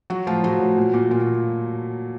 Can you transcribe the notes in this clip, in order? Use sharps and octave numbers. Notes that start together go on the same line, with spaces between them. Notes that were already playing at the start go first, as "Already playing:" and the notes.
F#3 F#4
A2 F3 F4
A2 F#3 F#4
A2
A#2
A#2
A#2 F4
F#4